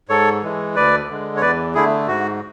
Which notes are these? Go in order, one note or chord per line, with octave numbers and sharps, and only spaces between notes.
G#2 A4 C#5
E3 G#3
D2 B4 D5
D3 G#3
C#5
E2 B4 D5
D3 A3 E4 G#4
G#2 F#4